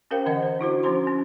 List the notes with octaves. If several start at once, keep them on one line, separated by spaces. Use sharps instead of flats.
C#4 G4 A#4 C5 F5 G5
D3 E3 C5 D#5 F#5
C5
D4 E4 F#4 C5
F3 C#4 F#4 C5 A#5 C6
C#4